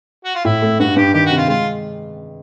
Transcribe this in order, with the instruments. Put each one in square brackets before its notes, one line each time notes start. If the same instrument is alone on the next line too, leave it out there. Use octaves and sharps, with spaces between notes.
[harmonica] F#4
F4
[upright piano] A2 [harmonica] E4
[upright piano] A3
[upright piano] G2 [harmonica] F#4
[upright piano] G2 [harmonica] G4
[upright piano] D#3 [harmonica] G4
[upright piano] C3 [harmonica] F#4
[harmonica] F4
[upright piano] G#3 [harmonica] F4